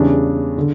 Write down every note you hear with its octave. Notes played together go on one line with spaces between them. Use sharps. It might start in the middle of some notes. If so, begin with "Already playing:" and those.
Already playing: E2 C#3 G3 D4
D3